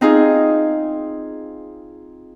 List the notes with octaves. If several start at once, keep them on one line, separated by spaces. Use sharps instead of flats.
C4 D#4 F4 G#4